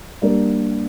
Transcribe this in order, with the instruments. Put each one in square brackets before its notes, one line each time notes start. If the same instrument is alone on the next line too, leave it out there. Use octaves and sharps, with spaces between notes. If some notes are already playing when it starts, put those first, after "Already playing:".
[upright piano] G3 A#3 D4 G4 A#4